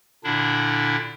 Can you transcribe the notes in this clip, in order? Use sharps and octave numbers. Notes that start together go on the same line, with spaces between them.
A#2 D3 D4 E4